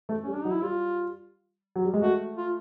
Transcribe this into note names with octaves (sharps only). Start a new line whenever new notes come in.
A3
G3 C#4
D4
F#3 D#4
E4
G3 F4
F#3
G3
G#3
A3 F#4
F4